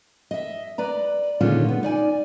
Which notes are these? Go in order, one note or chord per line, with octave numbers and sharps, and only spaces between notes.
D#5 E5
B4 D5 A#5
A#2 D3 D#3 G#3 C#4 F4
B3
D#4 D5 G#5